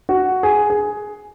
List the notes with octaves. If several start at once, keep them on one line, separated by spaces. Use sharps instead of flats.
F#4
G#4
G#4